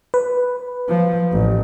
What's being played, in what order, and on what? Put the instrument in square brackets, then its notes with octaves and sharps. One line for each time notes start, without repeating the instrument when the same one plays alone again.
[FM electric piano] B4
[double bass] F3
A1